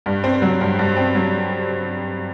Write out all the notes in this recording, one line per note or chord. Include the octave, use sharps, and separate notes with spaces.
G2
C4
F#3
G2
G2
C4
F#3